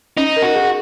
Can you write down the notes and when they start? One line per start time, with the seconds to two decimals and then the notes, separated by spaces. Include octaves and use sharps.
0.17 C#4 D#4
0.36 A#4
0.43 F#4
0.55 G#4